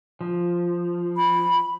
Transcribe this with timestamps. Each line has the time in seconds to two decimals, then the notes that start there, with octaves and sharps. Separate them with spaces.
0.21 F3
1.17 B5